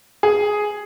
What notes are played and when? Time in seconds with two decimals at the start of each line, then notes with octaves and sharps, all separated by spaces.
0.23 G#4